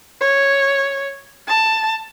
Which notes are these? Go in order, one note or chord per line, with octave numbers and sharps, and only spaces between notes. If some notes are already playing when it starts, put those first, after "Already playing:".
C#5
A5